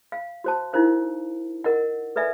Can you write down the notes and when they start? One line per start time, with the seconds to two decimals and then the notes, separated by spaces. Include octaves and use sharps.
0.12 F5
0.44 F#4 C5 A5
0.73 D#4 E4 A#4 C5 F5
1.64 A#4 D#5 F#5
2.16 A4 B4 D5 E5 F#5 G#5